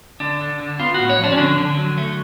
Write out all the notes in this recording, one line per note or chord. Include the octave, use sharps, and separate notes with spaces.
D3 D4
D3
D3
B3 F4
F#4
A2
C#5
F3 D4
C#4
D3 D4
D3
F#3
A3